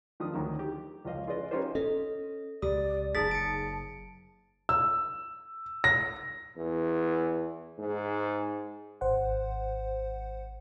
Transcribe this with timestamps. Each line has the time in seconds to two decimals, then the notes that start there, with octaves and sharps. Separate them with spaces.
0.20 D#3 F3 D4 D#6
0.34 D2 D#3 F#3
0.59 G4
1.05 C#2 F3 D#5 F5
1.27 F4 G#4 B4 D5 D#5
1.51 C#4 D#4 F4 G4 B4 C5
1.75 C#4 A4 D#5
2.62 C#2 G4 D5 D#6
3.15 F#1 D#4 G#4 A5 A6 B6
3.31 C#7 D7
4.69 E6
5.84 A#6
6.57 E2
7.79 G#2
9.01 G#1 C5 F#5